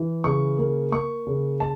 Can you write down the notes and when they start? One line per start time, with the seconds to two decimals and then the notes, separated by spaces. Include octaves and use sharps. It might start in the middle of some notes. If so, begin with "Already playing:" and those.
Already playing: E3
0.24 C#3 C#6
0.58 A#3
0.92 A#3 C#6
1.27 C#3
1.60 A5